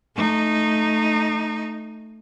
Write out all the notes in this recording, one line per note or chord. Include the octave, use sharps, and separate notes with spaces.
A3 D#4